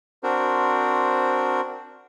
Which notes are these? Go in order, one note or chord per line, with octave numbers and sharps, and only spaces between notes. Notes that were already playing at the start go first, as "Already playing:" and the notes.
C4 D4 F#4 A#4 C5